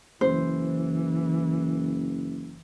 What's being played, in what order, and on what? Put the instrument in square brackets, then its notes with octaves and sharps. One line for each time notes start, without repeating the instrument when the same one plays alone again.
[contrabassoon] F#1 [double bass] E3 [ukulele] C5